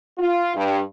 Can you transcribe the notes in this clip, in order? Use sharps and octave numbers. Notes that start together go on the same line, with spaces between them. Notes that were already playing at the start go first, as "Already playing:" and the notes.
F4
G2